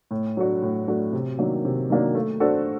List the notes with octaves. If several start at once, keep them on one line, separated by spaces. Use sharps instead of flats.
A2
F#3 A3 D4 F#4
A2
F#3 A3 D4 F#4
C3
D#3 F#3 A#3 D4
C3
D#3 F#3 A#3 D4
A3
D4 F#4 A4 C5